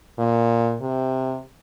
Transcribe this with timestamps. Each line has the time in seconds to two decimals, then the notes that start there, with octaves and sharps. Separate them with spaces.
0.18 A#2
0.81 C3